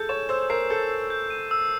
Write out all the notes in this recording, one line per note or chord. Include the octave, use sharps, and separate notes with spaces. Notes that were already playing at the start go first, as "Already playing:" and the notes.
Already playing: G#4 A4 G6
C#5 E7
C5 E6
A#4 C7
A4 G6
C7
G6
D#7
E6